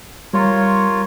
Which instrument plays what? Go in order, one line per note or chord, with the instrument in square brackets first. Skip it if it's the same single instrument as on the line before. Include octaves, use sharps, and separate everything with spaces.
[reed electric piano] G3 [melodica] F4 A#4 C#5